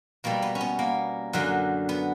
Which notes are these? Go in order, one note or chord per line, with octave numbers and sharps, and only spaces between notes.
B2 G3 A#3
B3
C#4
B3
A#3
F#2 D3 F#3
B3